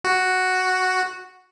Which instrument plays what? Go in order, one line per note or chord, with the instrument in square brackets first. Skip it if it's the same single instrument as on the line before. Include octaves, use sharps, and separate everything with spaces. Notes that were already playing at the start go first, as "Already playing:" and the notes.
[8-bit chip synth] F#4